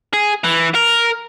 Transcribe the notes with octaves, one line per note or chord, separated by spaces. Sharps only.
G#4
E3
A#4